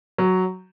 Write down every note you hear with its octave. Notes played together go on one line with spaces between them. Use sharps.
F#3